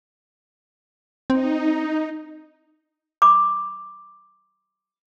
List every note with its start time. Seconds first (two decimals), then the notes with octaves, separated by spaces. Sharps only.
1.30 C4 D#4
3.22 B5 D6